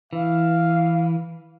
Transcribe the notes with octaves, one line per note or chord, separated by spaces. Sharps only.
E3 F5